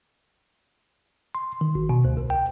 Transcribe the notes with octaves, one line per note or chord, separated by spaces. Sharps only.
C6
D#3
G#1
B2
D2
C2
G5